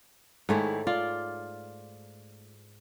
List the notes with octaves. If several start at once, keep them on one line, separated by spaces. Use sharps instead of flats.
G#2 D#3 G#3 A3 E4 C#5
F4 D5